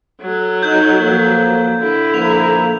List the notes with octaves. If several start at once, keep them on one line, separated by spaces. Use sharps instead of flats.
F#3 A4
D#4 G6
F3 A#3
D3 E4
A#2 F3 A#3 F7